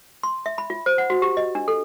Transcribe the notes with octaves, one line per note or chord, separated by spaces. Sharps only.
C6
E5
B5
F4
C5
F#5
F#4
G4
D#5
D4
A4